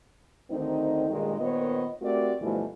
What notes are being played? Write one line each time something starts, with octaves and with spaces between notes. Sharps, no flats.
D2 D3 D#3 C4 D#4
G2 A#2 D#3 G#3
A#2 D#3 B3 C5 C#5 D#5
A3 C4 F#4 G4 A#4 D5
D2 B2 E3 F3 G3 A3